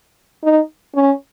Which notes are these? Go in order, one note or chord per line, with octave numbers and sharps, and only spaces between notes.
D#4
C#4